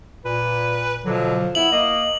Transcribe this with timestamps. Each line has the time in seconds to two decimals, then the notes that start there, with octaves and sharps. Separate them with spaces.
0.25 A#2 B4
1.05 B2 D3 F3 F#3
1.55 B3 E4 F#7
1.72 A#3 D#5